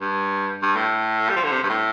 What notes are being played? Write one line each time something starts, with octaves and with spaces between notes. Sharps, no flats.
G2
G2
A2
G3
F3
D3
C3
G2
A2